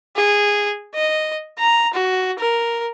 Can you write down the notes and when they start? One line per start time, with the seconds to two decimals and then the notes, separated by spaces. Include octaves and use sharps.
0.16 G#4
0.95 D#5
1.59 A#5
1.94 F#4
2.39 A#4